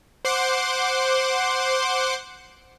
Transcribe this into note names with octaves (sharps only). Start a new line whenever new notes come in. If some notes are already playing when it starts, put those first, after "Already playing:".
C5 F#5 C6 D6